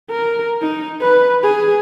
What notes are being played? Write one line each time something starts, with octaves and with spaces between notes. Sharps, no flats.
A#4
D#4
B4
G#4